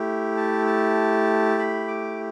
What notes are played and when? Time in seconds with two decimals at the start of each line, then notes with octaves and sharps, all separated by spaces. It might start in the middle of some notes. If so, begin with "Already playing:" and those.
Already playing: A3 E4 G4
0.37 A5
0.67 A5
1.59 B5
1.88 D6